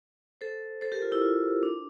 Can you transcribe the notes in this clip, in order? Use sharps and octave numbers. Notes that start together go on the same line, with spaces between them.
A4 C5
A4 C5
G4 A#4
F4 A4
E4 G4
F4
D4